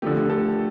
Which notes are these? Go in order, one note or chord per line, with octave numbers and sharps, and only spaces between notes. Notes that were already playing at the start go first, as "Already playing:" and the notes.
D3 F3 A3 G4
A4